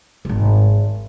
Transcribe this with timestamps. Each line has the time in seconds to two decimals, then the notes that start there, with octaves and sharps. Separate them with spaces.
0.25 D#1 G#1